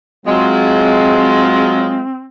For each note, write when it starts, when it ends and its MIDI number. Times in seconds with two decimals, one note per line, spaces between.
0.26 2.03 54
0.26 2.03 56
0.26 2.27 60
0.26 2.03 65